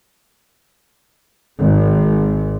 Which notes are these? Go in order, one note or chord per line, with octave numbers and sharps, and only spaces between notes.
G#1